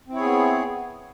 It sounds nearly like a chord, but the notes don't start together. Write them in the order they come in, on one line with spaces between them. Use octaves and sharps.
C4 E4 C#5 G#4 B3